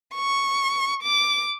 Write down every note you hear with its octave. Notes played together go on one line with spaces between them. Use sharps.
C#6
D6